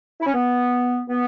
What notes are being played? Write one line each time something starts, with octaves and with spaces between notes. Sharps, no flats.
E4
C#4
B3
B3